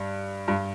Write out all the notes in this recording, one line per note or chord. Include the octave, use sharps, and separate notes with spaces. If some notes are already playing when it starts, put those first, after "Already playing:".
Already playing: G2
G2